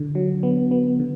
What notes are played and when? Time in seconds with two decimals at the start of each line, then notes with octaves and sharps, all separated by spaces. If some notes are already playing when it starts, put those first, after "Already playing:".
Already playing: D3
0.15 F#3
0.43 B3
0.71 B3
0.99 D3